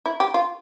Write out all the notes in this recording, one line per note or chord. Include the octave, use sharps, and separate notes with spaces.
E4
G4
F4